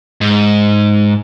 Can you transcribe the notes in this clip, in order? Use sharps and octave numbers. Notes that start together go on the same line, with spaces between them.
G#2